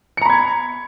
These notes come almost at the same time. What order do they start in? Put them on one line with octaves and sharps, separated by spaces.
C#7 A#5 B5 G#6